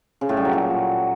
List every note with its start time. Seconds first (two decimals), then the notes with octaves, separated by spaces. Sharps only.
0.21 C#3
0.29 A2
0.37 G3
0.45 F#3
0.53 A#2